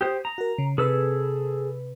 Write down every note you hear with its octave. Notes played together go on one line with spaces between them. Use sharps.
G4 C5 D#6
A#5
F#4 A#4
C#3
C3 G#4 A4 B4 E6